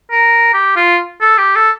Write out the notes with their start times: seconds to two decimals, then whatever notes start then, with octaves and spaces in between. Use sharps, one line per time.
0.11 A#4
0.53 G4
0.76 F4
1.21 A4
1.38 G4
1.55 A4